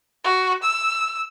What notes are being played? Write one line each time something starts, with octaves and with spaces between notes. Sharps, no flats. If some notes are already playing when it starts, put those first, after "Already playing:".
F#4
E6